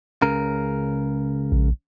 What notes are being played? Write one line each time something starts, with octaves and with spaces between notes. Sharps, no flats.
C#2 C#3 A#4
A#1